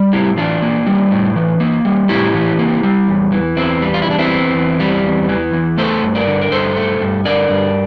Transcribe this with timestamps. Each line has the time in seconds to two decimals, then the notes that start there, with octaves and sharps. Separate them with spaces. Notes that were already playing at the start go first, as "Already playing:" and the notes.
Already playing: G3
0.13 A2 E4 G4
0.37 E3 D4 F4
0.62 A#3
0.87 G3
1.11 A2
1.36 E3
1.60 A#3
1.85 G3
2.09 A2 E4 G4
2.34 E3
2.59 A#3
2.83 G3
3.08 E2
3.32 E3
3.57 E2 C4 E4
3.82 G3
3.94 F4
4.02 E4
4.06 E2 D4
4.19 C4 E4
4.31 E3
4.55 E2
4.80 G3
5.04 E2
5.29 E3
5.53 E2
5.78 A3 A4 C5
6.03 G2
6.15 A#4 D5
6.27 D3
6.41 A#4
6.52 G2 A4 C5
6.77 A3
7.01 G2
7.25 D3 A#4 D5
7.50 G2